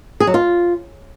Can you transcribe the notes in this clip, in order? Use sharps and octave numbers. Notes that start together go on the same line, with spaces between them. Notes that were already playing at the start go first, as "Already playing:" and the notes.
G#4
F#3
F4